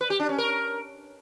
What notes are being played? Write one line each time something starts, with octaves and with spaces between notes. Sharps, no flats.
B4
G4
D4
C#4
A#4